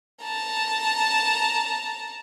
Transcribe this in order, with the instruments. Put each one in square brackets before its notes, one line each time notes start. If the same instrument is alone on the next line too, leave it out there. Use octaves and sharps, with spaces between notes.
[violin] A5 A#5